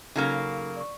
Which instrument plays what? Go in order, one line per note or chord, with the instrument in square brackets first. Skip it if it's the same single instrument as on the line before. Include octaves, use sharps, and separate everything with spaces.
[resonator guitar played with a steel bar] C#3 F#3 A#3 [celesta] D#4 A4 F6
[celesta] D5 C#6